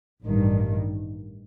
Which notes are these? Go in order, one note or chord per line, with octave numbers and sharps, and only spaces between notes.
A1 G2 D#3